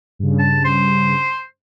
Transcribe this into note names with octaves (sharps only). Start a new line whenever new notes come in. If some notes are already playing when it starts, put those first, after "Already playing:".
G2 C#3
A5
C5